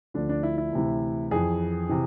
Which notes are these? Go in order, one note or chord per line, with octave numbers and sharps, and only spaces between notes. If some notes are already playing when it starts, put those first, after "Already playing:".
D2 D3 F3 D4
D4
E4
E4
D2 C3 E3
F2 E3 G#4
C3 E3